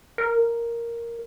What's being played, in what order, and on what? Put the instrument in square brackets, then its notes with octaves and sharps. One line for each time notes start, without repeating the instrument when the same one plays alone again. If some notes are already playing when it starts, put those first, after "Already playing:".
[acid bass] A#4